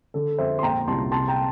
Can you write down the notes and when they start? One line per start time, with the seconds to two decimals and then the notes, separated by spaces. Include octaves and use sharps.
0.14 D3 A4
0.38 F2 C5 E5
0.59 C6
0.63 A#2 G5 A#5
0.87 C2 A5 C6
1.12 C3 A5 C6
1.28 G5 A#5